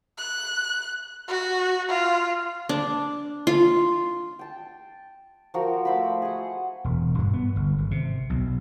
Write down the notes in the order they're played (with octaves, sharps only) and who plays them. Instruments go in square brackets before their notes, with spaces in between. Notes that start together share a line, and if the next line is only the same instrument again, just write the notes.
[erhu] F#6
F#4
F4
[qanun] D4
F4
[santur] G5 A5
F3 F#4 A#4 G5
A3 C5 B5
G#4 F#5
[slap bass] E1
G2
B3
G1
G#1
C3
B1